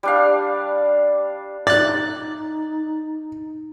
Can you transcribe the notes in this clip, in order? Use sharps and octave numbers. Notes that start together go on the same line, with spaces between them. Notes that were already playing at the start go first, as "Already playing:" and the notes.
G3 D4 F5
D#4 D5 F#6 A6